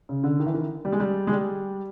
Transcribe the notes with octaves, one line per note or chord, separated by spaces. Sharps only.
C#3
D3
D#3
E3
D#3
G3
G#3
G3
G#3
G3